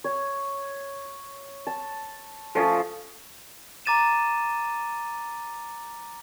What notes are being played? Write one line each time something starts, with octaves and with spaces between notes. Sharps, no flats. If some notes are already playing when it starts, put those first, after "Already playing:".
C#5
A5
F3 C#4 A4 A5 D#6
A#5 D6 A6 D#7 E7